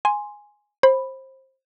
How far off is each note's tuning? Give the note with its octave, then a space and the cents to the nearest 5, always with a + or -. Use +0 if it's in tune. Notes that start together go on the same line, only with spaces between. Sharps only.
G#5 +0 C6 +0
C5 +20 B5 +0